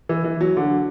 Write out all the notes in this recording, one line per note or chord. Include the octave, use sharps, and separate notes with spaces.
E3
E3
F#3
D3